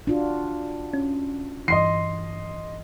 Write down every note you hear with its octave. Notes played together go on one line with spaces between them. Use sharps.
D4 F4 F#4
C#4
G2 E3 D#5 C6 C7